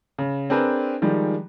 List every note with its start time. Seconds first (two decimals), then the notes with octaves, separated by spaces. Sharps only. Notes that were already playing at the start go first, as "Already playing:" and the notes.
0.18 C#3
0.50 C4 D4 G#4 A#4 B4
1.02 D#3 F3 G3 G#3